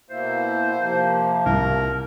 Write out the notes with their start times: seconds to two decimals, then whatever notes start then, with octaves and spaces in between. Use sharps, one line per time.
0.10 B2 A#3 E4 C5
0.78 C3 F3 A#3
1.46 C2 A#4